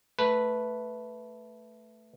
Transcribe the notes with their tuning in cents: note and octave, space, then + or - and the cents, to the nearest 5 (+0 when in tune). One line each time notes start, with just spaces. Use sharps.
A3 +0 B4 +0